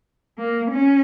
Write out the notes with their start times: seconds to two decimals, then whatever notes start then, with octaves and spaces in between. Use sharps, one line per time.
0.38 A#3
0.71 C#4